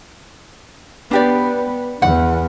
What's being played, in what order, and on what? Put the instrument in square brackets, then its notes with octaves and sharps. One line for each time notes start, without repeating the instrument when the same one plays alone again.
[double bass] B3 [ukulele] D4 G4 D5
[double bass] E2 [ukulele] F#5